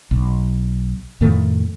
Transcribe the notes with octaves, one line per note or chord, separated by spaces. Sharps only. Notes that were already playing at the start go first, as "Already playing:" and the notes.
B1
F2 A2 D#3 A3